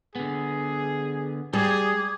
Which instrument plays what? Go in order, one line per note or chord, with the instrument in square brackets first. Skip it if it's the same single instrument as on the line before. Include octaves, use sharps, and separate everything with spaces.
[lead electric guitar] D3 B3 [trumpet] G#4
[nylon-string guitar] G3 [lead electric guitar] G4 [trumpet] G#4 [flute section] D6 D#6 G#6